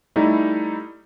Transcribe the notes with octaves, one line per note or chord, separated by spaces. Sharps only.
G3 A3 D#4 E4